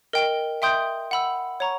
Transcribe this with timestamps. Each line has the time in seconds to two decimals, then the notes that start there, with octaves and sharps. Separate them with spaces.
0.13 A#4 D#5 G5
0.62 E5 G5 C6 D#6 G6
1.11 F#5 B5 E6
1.60 C#5 F#5 A#5 C#6